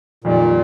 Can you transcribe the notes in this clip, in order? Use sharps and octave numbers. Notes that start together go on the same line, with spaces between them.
F2 A#2 D#3 G3